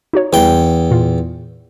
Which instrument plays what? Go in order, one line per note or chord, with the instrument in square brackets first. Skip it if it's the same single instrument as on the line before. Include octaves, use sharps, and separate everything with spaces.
[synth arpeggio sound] D#4 F#4 C#5
[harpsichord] E2 G5 [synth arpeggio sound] E3 G3
[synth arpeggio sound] A#2 F4